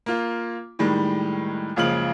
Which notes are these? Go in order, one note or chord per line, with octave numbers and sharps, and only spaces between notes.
A#3 F4
A2 D#3 G3 G#3
F#1 C#2 C#3 F3 F6 F#7